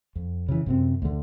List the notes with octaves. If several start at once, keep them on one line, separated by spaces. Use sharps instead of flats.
F2
C#3 E3
F#2 C3 C4
D2 D3